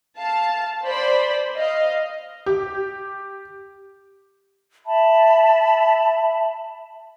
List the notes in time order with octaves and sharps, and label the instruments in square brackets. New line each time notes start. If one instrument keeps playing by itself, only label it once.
[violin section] F5 A5
C5 D5 B5
D#5 F5
[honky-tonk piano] G4
[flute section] E5 A5 B5